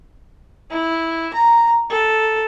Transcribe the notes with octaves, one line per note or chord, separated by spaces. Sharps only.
E4
A#5
A4